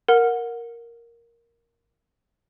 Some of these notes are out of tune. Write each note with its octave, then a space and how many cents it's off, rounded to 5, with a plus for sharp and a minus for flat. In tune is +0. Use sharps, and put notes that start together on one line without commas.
A#4 +0 F#5 -20